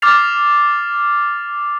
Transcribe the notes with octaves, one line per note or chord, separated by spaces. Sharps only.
D6 F6 A6 C7 F7